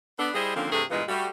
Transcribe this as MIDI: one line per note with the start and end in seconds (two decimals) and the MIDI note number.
0.19 0.30 59
0.19 0.30 62
0.19 0.30 69
0.35 0.52 55
0.35 0.52 64
0.35 0.52 68
0.35 0.52 72
0.35 0.52 75
0.56 0.70 50
0.56 0.70 51
0.56 0.70 53
0.56 0.70 58
0.56 0.70 60
0.56 0.70 61
0.71 0.83 43
0.71 0.83 48
0.71 0.83 57
0.71 0.83 68
0.71 0.83 69
0.90 1.02 43
0.90 1.02 46
0.90 1.02 52
0.90 1.02 56
0.90 1.02 59
0.90 1.02 65
1.08 1.28 55
1.08 1.28 57
1.08 1.28 66